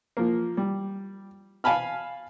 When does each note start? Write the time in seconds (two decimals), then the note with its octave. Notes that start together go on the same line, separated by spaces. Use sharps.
0.17 F3 A#3
0.57 G3
1.64 F5 G#5 A5 B5 F6